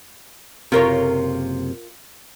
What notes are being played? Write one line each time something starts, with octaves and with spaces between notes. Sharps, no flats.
F#1 C3 F4 A#4 C#5